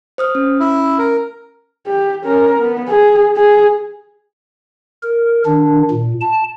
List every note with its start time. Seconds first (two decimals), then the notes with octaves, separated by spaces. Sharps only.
0.18 C5 D#6 F6
0.35 C#4
0.60 E4
0.99 A#4
1.87 G4
2.24 C#4 A#4
2.59 B3
2.88 G#4
3.36 G#4
5.03 A#4
5.46 D#3 D4
5.91 A#2
6.21 A5